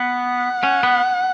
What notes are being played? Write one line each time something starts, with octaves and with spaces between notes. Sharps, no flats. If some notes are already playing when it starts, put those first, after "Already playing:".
Already playing: B3 F#5
C#4
B3